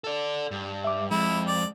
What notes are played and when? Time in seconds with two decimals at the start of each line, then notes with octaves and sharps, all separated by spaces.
0.04 A4 D5
0.51 G2
0.84 E5 D6
1.11 F2 G#3 E4
1.47 D5